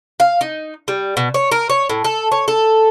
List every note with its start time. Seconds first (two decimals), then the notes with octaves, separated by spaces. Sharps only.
0.20 F5
0.41 D#4
0.88 G3
1.17 B2
1.34 C#5
1.52 A#4
1.70 C#5
1.90 A2
2.04 A4
2.32 C#5
2.48 A4